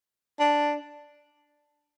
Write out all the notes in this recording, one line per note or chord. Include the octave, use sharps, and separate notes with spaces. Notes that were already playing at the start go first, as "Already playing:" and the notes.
D4